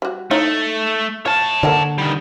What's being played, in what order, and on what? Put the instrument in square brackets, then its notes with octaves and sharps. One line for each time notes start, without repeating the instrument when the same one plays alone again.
[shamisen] G3 F#4
[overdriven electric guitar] A3 [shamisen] D#4 E4 C#5
[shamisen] F4 [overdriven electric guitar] C#5 A5
[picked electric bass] D3 [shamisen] A#3 A4 D5
[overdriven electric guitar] D#3 G3